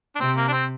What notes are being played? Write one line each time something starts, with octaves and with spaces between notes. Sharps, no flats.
D4
C3 C4
A#3
D4
C4